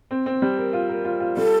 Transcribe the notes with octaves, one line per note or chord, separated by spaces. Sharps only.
C4
C4
G3
A#4
F4
A#4
F4
F4
G3 A4